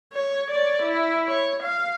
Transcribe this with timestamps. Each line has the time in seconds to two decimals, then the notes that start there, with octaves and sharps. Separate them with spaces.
0.13 C#5
0.51 C#5 D5
0.83 E4
1.28 C#5
1.63 F5